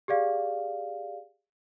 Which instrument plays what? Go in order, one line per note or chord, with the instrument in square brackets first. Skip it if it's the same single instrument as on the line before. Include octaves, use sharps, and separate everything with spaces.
[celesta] G4 G#4 D5 F5